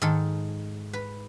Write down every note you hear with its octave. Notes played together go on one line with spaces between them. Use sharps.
G#2 D#3 A4
B4